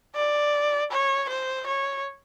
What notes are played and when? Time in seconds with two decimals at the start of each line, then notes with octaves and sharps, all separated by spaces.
0.15 D5
0.91 C#5
1.29 C5
1.67 C#5